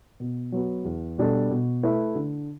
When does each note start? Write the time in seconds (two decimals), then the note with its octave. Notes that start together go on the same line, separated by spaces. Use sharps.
0.20 B2
0.52 F#3 B3 F#4
0.85 E2
1.18 B2 G3 D4 A4
1.51 B2
1.83 A3 E4 B4 E5
2.15 D3